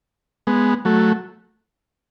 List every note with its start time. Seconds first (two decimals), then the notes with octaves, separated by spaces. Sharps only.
0.47 G#3 B3
0.85 F#3 A3